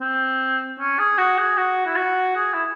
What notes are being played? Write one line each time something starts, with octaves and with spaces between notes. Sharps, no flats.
C4
C#4
G#4
F#4
G#4
F#4
E4
F#4
G#4
E4